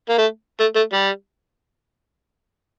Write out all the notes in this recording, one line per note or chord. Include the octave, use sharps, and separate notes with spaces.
A#3
A3
A3
A3
G3